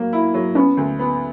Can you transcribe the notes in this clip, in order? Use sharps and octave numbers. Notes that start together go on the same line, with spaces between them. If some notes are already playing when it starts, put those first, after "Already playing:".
Already playing: F#3 A#3
E4
F#3
B3 C#4
D2
B3